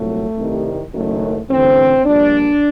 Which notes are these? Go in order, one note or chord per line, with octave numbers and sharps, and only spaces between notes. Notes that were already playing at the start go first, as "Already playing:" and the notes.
Already playing: C2 A#2 F#3 A3
C2 C3 D#3 G3
F#1 F#2 D#3 F#3 A3
A1 G2 D3 C4
A#1 A#2 G3 D4